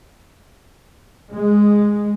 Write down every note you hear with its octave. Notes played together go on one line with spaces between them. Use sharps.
G#3